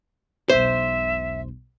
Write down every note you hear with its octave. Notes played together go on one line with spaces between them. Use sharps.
E1 B1 C5 E5